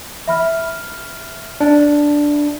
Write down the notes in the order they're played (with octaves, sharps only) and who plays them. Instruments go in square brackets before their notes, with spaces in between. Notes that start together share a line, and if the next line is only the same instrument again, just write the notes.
[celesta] E5 B5 F6
[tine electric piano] D4